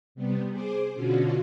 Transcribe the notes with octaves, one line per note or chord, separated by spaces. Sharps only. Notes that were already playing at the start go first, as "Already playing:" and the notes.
C3 G3 B3
G#4 C5 D6
B2 D3 C#4 F4 F#4